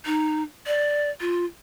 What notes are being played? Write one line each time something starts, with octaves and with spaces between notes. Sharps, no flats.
D#4
D5
F4